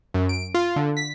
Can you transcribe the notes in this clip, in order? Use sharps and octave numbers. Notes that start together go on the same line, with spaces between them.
F#2
D7
F4
D3
B6